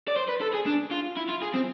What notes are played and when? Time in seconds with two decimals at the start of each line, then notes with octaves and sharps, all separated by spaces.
0.08 D5
0.17 C5
0.29 B4
0.42 A4
0.54 G#4
0.67 D4
0.91 F4
1.17 E4
1.29 F4
1.42 G#4
1.54 C4